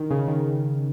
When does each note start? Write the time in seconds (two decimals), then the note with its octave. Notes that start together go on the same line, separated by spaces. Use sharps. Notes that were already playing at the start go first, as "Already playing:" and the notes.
Already playing: D#3
0.11 C#3
0.28 D#3